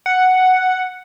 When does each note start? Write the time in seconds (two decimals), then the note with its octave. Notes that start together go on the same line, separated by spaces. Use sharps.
0.06 F#5